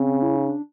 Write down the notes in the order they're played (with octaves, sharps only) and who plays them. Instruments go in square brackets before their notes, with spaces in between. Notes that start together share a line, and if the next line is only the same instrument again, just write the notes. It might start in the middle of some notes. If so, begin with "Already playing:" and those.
Already playing: [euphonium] C#3 [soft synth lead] C4
[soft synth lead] E4
D#4
D4